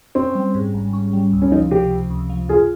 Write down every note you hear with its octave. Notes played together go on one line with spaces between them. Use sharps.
C4 C#4
G3
G#2
G#1
C#4
G3
C#2
C#4
F3 D#4
C3 G4
C#2
C#2
F3
F4 G#4